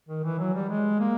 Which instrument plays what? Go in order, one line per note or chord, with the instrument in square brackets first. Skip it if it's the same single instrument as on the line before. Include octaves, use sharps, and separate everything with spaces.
[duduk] D#3
E3
F#3
G3
G#3
A#3